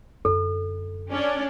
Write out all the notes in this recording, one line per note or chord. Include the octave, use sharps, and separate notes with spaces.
F#2 D3 A4
C#4 D4 D5